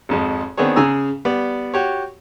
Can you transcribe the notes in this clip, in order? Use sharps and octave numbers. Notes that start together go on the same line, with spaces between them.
G#1 F2 G#3
D#3 B3 C4 D4 G#4 C#5
C#3 G#4 G#5 A#5 E6
G3 B3 D5
F#4 G4 C#5